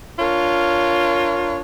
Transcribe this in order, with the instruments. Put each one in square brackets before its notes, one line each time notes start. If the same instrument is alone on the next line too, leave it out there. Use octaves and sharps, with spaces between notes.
[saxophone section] D4 F4 A#4 C#5